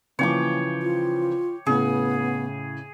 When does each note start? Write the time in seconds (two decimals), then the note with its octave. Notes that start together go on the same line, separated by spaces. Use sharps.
0.19 C#3 E3 F3 A#3 C#5 G5 D6
0.82 F4
1.66 A2 C#3 B3 G#4